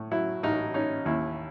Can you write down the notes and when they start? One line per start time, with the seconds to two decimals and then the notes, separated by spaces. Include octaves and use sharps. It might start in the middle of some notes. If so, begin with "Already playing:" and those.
Already playing: A2
0.12 F#3 E4
0.43 A1 D#4
0.74 C#4 D#4
1.05 D#2 E4